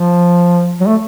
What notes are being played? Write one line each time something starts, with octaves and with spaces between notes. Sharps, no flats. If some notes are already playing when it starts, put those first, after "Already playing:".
Already playing: F3
F#3
A3